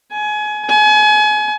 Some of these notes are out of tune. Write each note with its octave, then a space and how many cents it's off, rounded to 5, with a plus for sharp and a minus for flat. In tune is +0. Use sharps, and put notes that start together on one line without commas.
G#5 +25
G#5 +35